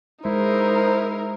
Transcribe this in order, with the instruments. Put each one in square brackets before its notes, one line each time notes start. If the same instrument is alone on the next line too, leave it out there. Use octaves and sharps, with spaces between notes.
[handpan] G#3 [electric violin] D#4 A#4 [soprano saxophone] E4 [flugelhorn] C5